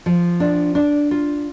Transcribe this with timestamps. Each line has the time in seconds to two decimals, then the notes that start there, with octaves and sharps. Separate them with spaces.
0.06 F3
0.40 D4
0.75 D4
1.11 F4